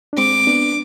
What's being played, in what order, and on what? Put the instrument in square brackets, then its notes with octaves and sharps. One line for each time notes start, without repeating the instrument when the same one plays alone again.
[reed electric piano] D4
[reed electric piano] G#3 C4 [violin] D6
[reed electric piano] B3 D4